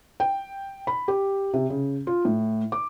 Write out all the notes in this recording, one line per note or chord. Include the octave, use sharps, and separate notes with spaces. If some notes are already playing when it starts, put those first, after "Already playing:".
G5
B5
G4
C3
C#3
F4
A2
D6